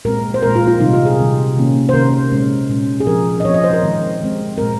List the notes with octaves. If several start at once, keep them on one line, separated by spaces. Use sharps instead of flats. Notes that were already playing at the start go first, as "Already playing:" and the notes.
A#2 G#3 C4 A#4
C5
A#2 G#3 C4 A#4
F4
F4
C3 D#3 G3 C4 D#4
F4
G#4
C3 D#3 G3 C4
C3 D#3 A#3 C#4
C5
C3 D#3 A#3 C#4 A#4
A#2 G#3 C#4
A#2 G#3 C#4
G#4
F3 C4 A#4
D#5
F3 C4 C#5
D#5
C5
A#4
D#3 G#3 C4
D#3 G#3 C4
A#2 G#3 C4 A#4